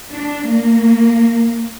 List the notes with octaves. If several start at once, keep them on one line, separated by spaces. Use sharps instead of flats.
D4
A#3